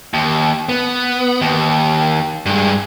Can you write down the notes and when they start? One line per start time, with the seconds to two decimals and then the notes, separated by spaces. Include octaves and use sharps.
0.14 D#2
0.69 B3
1.41 D#2
2.46 G2 G#3